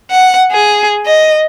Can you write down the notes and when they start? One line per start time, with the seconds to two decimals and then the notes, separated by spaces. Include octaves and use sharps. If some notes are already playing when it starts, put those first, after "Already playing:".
0.11 F#5
0.52 G#4
1.06 D#5